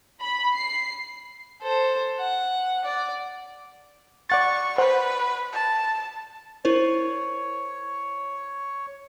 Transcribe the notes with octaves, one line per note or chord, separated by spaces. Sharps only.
B5
C7
A4 C5
F#5
D5
D5 F#5 C#6 A6
B4 C5 F#5
A5
E4 A#4 C5 C#5